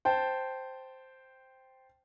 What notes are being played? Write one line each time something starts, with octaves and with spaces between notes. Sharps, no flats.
C5 G5 A5